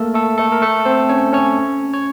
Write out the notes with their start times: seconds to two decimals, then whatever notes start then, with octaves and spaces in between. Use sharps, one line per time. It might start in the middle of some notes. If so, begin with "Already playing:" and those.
Already playing: A3 A#3 A4 A#4
0.14 A3 A4
0.38 A3 A4
0.52 A#4
0.62 A3 A4
0.85 C4 C5
1.09 C#4 C#5
1.33 C#4 C#5
1.93 C#5